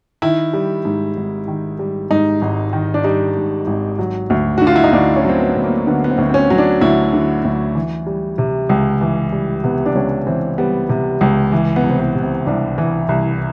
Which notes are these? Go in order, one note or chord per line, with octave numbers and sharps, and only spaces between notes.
D#3 E4
G3
G#2
G#1
D#3
G3
G#2 D#4
G#1
D#3
D4
G3 D#4
G#2
G#1
F#3
D2
F#4
D3
F4
E4
D#4
D2 D4
C#4
F#3 C4
B3
D2
A#3
D3 B3
B3
C4
D2
C4
C#4
F#3
D4
D2 E4
D3
D2
E3
G3
C3
C#2
E3
G3
C3 B3
D4
C#2 C#4
E3 C4
G3 B3
C3
C#2
E3
B3
C2
C4
B3
C3
C4
C2 D4
E3
C2